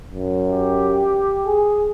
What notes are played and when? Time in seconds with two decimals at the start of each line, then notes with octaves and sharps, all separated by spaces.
0.11 F#2
0.48 G4
1.47 G#4